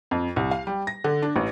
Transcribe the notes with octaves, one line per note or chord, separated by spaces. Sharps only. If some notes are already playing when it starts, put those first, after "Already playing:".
F2
C2
F5
G3
A#6
D3
D4
A1